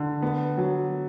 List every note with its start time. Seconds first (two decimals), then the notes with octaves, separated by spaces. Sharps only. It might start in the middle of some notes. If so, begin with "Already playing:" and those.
Already playing: D3
0.22 B3
0.57 F#3